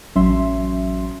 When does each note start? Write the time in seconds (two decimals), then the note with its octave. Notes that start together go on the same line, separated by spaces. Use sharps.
0.15 A1 F#3 C#4 E5 C6